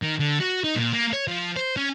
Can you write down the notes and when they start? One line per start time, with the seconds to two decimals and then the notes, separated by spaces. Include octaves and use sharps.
0.02 D#3
0.19 D3
0.40 F#4
0.64 D#4
0.76 A#2
0.93 A#3
1.13 C#5
1.28 F3
1.57 C5
1.77 C#4